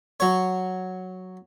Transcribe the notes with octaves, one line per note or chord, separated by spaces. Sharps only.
F#3 C#5